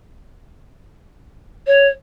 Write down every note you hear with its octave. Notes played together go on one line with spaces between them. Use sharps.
C#5